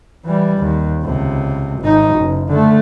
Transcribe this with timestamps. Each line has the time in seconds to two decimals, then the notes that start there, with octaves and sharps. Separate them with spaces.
0.25 E3 G3
0.59 D#2
1.03 C#2 C3
1.81 G#1 D#4
2.16 F#1
2.49 D3 A3